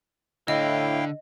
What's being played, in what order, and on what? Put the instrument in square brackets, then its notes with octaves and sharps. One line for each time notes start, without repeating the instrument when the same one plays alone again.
[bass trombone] A2 [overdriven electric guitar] D3 [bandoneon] E4 F5 G5 [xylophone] D#5